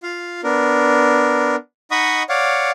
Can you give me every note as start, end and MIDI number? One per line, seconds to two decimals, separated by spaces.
0.03 0.41 65
0.03 0.41 77
0.43 1.56 59
0.43 1.56 62
0.43 1.56 70
1.91 2.23 63
1.91 2.23 75
1.91 2.23 78
1.91 2.23 83
1.91 2.23 85
1.91 2.23 87
2.29 2.71 73
2.29 2.71 74
2.29 2.71 77
2.29 2.71 78